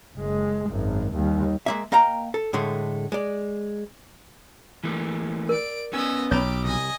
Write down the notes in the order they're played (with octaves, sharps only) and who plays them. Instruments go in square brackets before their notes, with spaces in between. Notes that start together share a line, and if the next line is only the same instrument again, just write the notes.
[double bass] F#1 G#3
G#1 F#2
D#2 G3
[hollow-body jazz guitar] G#3 A#3 E5
A#3 D#5 F5 G5 A#5
A4
A2 D3 G#3 A3
G#3 D5
[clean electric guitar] E3 A3 A#3
[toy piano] A#4 [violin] D5 D7
[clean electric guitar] B3 C#4 G#5 [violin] D#5 E6
[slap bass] B1 [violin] G4 D6 [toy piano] C#5 A#5 B5
[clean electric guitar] C2 [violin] D#5 G#5